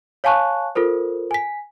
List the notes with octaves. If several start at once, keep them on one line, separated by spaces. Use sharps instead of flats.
C#5 F5 G#5 A5 C#6 F#6
F4 A4 A#4 C5
G#5 B6